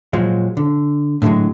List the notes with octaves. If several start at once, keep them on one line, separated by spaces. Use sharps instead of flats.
A#2 F3 F#3 G#3
D3
A2 D3 E3 F#3 G#3